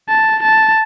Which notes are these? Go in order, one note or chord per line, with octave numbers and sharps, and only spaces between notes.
A5
A5